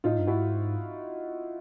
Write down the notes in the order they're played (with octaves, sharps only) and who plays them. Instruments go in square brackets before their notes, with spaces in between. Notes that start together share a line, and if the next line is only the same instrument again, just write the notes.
[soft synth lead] A2 [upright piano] D#4 F4
[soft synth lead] G2
[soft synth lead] G#2 [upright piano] E4 F#4